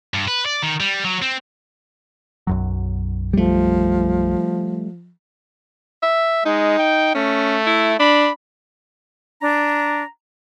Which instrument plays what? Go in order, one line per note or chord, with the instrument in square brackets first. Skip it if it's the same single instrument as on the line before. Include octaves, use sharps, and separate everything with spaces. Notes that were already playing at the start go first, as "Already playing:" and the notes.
[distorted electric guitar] G2
B4
D5
D#3
G3
F#3
C4
[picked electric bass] B1 F#2 F#3
[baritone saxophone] F3 [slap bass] G3 A3
[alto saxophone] E5
[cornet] G#3 [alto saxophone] D#4
[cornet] G5
[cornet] A3 [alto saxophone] C#4
[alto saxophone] E4
[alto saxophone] D4 [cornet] B5
[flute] D4 [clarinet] A#5